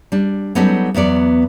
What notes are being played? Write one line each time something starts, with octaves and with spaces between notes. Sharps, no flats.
G3 D4
F#3 G3 B3 C#4 D#4 A4
E2 F#3 B3 D5